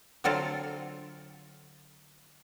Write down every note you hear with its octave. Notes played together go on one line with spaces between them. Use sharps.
D3 F#3 C4 F4 A4